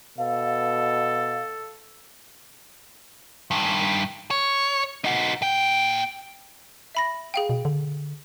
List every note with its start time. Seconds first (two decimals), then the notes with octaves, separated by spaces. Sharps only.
0.18 B2 A4 F5
3.51 G2 D#3
4.31 C#5
5.04 D#4 F#4
5.42 A#2 G5
6.95 E5 B5 A#6
7.34 G#4 F5 G5
7.50 B2
7.65 D3